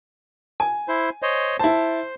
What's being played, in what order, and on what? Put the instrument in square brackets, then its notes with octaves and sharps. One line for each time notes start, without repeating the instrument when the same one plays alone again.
[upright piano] G#5
[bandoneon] E4 C5
C5 C#5 D#5
[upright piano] E4 A5 [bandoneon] C5